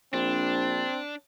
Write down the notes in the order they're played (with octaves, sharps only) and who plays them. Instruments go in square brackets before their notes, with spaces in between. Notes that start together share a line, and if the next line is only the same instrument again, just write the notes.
[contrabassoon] A#1 [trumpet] C4 [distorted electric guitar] D4